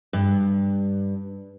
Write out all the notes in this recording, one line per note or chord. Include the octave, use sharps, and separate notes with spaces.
G2